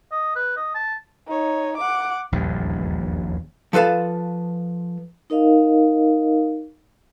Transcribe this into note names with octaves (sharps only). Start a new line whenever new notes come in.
D#5
B4
D#5
A5
D#4 C#5
F#5 D6
D#1 A#1 E2 G2
F3 A4 B4 F5 A5
D#4 A#4 D#5 F5